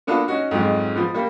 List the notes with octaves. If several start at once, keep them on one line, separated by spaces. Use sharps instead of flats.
A#3 B3 D4 F4 F#4 A4
C#4 D#4 F#4
F2 G#2 F3 F#3 G#3
F3 B3
G3 A#3